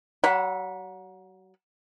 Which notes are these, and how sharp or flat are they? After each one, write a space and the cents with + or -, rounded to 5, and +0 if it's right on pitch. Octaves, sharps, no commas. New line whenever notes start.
F#3 +35 F#5 -20 B5 +0